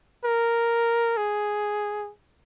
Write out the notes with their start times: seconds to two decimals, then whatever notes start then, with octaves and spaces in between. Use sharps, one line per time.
0.25 A#4
1.17 G#4